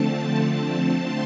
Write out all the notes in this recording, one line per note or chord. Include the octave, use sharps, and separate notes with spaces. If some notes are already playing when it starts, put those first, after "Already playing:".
Already playing: D3 F3 A3 C4 A5
C6